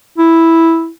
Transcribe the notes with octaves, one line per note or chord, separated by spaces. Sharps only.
E4